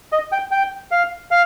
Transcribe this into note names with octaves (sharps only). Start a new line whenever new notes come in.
D#5
G5
G5
F5
F5